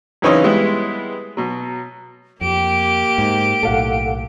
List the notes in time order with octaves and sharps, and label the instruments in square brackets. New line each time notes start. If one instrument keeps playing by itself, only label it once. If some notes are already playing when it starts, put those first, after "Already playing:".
[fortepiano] F#2 C#3 E3 C4 C#4 D#4
G3 G#3 B3 E4
B2 F#3
[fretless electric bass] F2 [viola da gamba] A#3 G4 [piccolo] D7
[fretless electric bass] G#2
[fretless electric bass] B1 A2 [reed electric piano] A4 F5 F#5